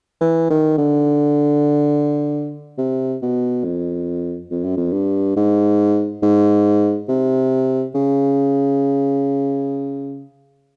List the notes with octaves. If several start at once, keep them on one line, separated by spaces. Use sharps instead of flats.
E3
D#3
D3
C3
B2
F2
F2
F#2
F2
G2
G#2
G#2
C3
C#3